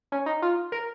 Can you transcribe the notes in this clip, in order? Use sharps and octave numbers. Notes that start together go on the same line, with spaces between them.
C#4
D#4
F4
A#4